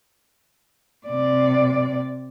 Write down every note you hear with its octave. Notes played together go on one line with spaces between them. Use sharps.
C3 D5